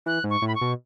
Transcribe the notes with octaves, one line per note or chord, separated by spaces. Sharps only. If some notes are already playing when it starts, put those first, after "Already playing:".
E3 F#6
G#2
C#6
A2
B5
C#6
B2